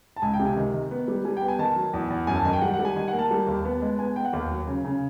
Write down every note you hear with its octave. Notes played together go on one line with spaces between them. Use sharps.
A5
C#2 G#5
G5
C3
G#5
D#3
D#3
B3
G3
G3 G#5
G5
B3
G#5
D#3 A5
F#3
E2
E2
F#2 G#5
A5
D#3 G#5
G5
G3 F#5
F#5
G3
G#5
D#3 G#5
F#5
A#3
A5
G3
D#2
B3
G#3
B3 G#5
B3 G5
F#5
D#2 F5
F#3
C#3
C#3